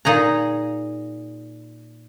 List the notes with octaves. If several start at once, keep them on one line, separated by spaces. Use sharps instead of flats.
A#2 D#4 G#4 A#5